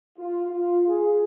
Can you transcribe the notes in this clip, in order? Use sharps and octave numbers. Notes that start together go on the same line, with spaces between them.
F4
F4
G#4